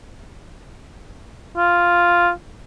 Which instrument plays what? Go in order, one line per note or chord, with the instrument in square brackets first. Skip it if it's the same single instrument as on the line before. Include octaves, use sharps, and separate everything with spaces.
[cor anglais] F4